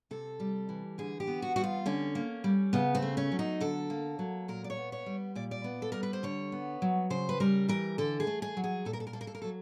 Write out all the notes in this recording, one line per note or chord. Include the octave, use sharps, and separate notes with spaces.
C3 A4
G3
E3
D3 G#4
G4
B3
F#4
G3 F#4
F4
D3 C#4
A#3
G3
C#3 B3
C4
A3
C#4
F#3
D#4
D3 A4
A#3
F#3
A#2 A#4
D5
C#5
B3
C#5
G3
A#2 D5
D5
B3
A4
G3 A#4
B4
C5
D3 C#5
B3
F#3
C#3 C5
B4
G3 A#4
E3 A#4
D3 A4
G#4
A3
G#4
F#3
G#4
A#2 A4
A#4
A4
A#4
A#3 A4
A#4
A4
A#4
A4
F#3